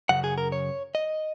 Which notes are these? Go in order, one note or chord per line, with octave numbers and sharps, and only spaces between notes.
F#2 C#3 F#5
G#4
A#4
C#5
D#5